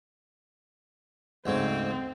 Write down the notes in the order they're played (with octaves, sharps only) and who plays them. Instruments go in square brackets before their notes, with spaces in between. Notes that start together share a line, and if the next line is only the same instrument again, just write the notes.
[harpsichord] D2 G#2 C#3 [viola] C4